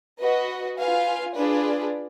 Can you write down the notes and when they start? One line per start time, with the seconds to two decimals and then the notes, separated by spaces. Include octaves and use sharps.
0.20 F#4 B4 D#5
0.78 F4 B4 F5 G#5
1.36 D4 F4 G#4 B4 D5